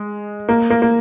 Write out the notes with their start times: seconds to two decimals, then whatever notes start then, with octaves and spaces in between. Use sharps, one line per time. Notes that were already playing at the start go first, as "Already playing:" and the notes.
Already playing: G#3
0.49 A#3
0.70 A#3
0.82 A#3